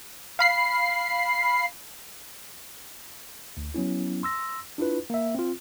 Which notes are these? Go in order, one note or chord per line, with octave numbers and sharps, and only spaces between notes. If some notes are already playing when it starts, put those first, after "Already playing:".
F5 B5 C7
D2
F#3 B3 C#4 E4
C6 E6 A#6
D4 E4 F4 B4
A#3 E5
C4 F4